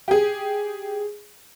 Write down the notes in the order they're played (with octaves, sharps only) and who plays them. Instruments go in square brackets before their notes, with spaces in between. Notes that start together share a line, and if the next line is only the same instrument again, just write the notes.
[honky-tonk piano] G4 G#4